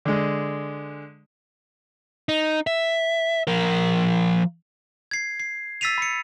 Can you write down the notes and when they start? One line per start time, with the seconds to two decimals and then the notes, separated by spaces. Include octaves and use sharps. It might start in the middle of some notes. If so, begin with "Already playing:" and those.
0.05 D3 G#3
2.29 D#4
2.67 E5
3.47 F3 A#4
5.11 G#6 C7
5.40 C7
5.81 E6 A6 B6 C7 D#7 F7
5.98 B5 C#7